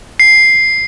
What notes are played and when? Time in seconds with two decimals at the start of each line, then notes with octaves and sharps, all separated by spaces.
0.20 C7